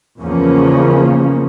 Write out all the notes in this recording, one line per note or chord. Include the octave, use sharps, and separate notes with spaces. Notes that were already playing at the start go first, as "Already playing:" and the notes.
E2 C#3 F3 A#3 C#4